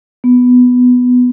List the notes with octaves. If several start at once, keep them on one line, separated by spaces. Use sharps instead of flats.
B3